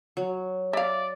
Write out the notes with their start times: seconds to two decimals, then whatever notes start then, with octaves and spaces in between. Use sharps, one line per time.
0.17 F#3
0.73 D5 E5 F5